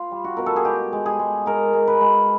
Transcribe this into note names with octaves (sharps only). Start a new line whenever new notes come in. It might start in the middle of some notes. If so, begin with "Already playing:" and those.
Already playing: F4
G3
F#4
B2 A#4
A4
G#4
G#3 G4
G#3
G#4
G#3
G#3 A#4
G#3
B4
G#3